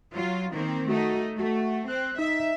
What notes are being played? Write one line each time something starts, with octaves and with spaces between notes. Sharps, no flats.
F#3 F4
D#3 A#3 C4
A3 D#4 F#4
A3 F#4
C4 F#6
D#4 E5